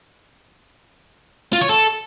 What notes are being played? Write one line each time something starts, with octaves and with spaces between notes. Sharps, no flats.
F4
C#5
A4